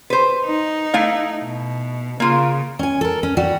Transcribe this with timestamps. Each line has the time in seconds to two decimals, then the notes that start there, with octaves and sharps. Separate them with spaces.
0.10 B4 C5
0.45 D#4
0.94 A3 E4 F5
1.44 B2
2.20 C#3 A#3 F4
2.79 C#4 G#5
3.01 A4 A#4
3.23 C#4
3.37 G3 F#4